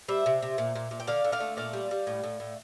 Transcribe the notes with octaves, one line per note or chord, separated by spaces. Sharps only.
G3 C5 E5
C3
C3
A#2
A#2
A#2
G5
D3 D5 F5
D3
D5 F5
A3
A#2 D5 F5
G3
G3
A2
A2
A2